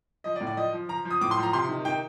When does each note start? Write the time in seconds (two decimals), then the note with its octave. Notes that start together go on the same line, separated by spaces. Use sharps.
0.24 F3 D#5
0.36 D5
0.41 A2
0.47 D5
0.57 F3 D#5
0.73 F3
0.89 F3 A#5
1.05 F3
1.11 D#6
1.21 A2 D6
1.31 C6
1.38 F3
1.43 A#5
1.53 C3 C6
1.69 D#3
1.85 D#3 G5